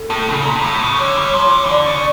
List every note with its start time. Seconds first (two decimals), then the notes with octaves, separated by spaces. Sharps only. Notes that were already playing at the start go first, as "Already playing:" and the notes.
Already playing: A4
0.10 A2
0.29 C#3
0.45 A#2
0.56 G2
0.64 A2
0.81 C#3
0.98 D3 C#5
1.16 G3
1.34 F3
1.52 D3
1.64 E3
1.69 D3 D5
1.86 C#3